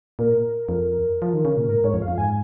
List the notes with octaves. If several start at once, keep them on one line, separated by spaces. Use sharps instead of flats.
A#2 A#4
F2
F3
D#3
C#3
A#2
G#2 A#4
G#2 C#5
F2
F5
F2
G#2 G#5